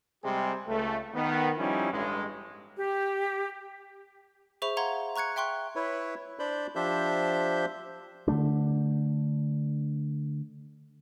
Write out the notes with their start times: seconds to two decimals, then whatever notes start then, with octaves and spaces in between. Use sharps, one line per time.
0.23 C3 G3 G#3 C4 G4 G#4
0.67 C#2 A3
1.14 D#3 B3
1.58 F3 G3 C#4 D#4 E4
1.92 A1 G2 G#3
2.76 G4
4.62 G#4 C5 E5 B5 C#6 F7
4.77 F5 F#5 A#5 C6 G#6
5.16 A#5 C#6 F#6 G#6 C#7
5.36 E5 G5 C6 C#6 F#6
5.76 E4 B4 C#5
6.39 D4 C5 D5 B5 G6
6.75 F3 D4 G4 C5 E5 G6
8.28 D3 D#3 A3 D4